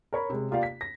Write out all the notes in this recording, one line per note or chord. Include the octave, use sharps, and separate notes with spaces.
A#4 C#5 B5
C3 G#3
A#3 F4 G4 D5 F5
B6
A#6